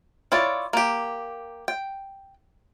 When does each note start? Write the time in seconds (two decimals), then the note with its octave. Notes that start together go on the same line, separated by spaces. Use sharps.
0.32 E4 F4 C#5 D5
0.73 A#3 G4
1.68 G5